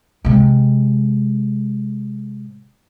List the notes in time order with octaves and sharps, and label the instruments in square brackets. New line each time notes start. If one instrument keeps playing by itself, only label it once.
[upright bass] C3 G#3